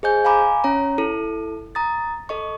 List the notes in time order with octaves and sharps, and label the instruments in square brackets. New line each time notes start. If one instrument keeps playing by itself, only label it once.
[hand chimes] G#4 C5 D#5 G#5 G6
F5 G#5 A#5 B5 D6
C#4 C#5 A#5
E4 A4
A#5 D#6 A6
A4 D#5 C#6